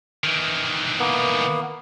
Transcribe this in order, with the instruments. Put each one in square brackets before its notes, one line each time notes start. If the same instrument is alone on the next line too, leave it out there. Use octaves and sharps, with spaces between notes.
[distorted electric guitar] D#3 E3
[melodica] A#3 B3